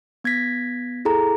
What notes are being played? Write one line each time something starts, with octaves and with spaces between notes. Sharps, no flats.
B3 G#6 A#6 B6
E4 G#4 A4 A#5